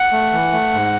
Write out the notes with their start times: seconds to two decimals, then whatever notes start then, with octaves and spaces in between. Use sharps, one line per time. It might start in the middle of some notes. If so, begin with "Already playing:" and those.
Already playing: F#5
0.12 A3
0.32 E3
0.53 A3
0.73 G#2